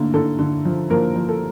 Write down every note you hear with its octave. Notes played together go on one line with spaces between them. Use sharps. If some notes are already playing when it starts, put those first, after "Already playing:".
Already playing: D3 A3 A#3
D3 A4
D3
F3
F3 A#3 A#4
F3
A4